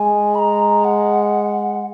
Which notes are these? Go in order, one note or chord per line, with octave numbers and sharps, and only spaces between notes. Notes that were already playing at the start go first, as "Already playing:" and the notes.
Already playing: G#3 G#5
B5
A#5
F#5